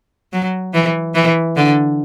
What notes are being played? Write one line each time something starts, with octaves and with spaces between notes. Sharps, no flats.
F#3
E3
E3
D3